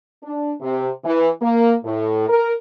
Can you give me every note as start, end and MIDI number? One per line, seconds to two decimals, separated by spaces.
0.24 0.53 62
0.61 0.89 48
1.05 1.29 52
1.42 1.74 58
1.84 2.25 45
2.29 2.54 70